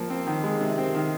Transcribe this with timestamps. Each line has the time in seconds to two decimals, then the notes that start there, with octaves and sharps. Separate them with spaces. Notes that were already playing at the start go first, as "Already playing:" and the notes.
Already playing: F3 A#3
0.10 C4
0.27 D#3
0.44 G#3
0.61 C3
0.78 C4
0.94 D#3